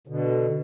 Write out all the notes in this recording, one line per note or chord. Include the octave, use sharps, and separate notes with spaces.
B2 D3